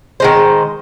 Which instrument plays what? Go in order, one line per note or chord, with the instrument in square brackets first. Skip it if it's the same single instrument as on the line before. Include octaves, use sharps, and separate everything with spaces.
[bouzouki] D#3 G#3 C5